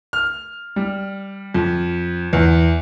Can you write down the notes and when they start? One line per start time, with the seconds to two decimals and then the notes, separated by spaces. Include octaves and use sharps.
0.13 F6
0.76 G3
1.54 F2
2.33 E2